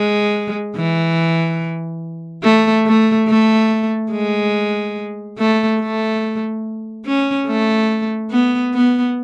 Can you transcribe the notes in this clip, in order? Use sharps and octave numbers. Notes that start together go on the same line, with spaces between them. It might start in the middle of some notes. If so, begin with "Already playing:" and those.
Already playing: G#3
E3
A3
A3
A3
G#3
A3
A3
C#4
A3
B3
B3